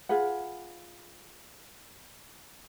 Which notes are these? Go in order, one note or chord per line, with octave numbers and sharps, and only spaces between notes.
F4 G#4 B4 F#5